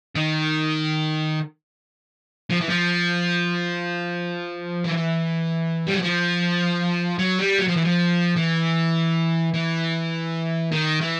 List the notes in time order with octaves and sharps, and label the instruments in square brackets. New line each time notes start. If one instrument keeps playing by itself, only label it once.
[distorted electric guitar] D#3
F3
E3
F3
E3
G3
F#3
F3
F#3
G3
F#3
F3
E3
F3
E3
E3
D#3
E3